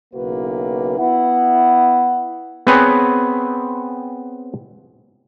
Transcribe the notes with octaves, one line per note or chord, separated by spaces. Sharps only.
B1 C#3 A#3 E4 F#4 B4
B3 E4 F#5
B3 C4 G#4 B4 C#5